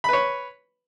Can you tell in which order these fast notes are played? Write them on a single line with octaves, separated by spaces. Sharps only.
B5 B4 C#5